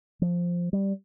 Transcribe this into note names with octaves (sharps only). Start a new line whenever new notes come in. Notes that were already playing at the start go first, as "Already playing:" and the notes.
F3
G3